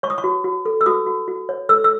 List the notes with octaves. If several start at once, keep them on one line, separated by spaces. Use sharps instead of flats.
C#5 C#6
D#6
C#6
F#4
F#4
A4
E6
F#4 D#6
F#4
F#4
C#5
A4 E6
E6